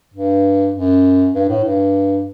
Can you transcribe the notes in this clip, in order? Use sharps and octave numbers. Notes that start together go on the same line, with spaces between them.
G2
F#2
G2
A2
G2